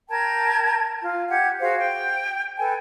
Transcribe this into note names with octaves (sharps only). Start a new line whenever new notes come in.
A#4 G5 A5 G#6
F4
G4 F#5 G#6
F#4 G#4 C5 F5
G5
A4 B4 G5 G#5